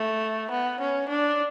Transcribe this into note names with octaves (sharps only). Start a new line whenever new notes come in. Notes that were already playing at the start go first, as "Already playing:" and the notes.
Already playing: A3
B3
C#4
D4